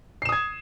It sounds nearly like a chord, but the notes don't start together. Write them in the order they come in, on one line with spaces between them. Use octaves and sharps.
C7 E7 D#6 G#6